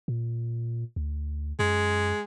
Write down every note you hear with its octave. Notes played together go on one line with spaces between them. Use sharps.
A#2
D2
F#2 G#3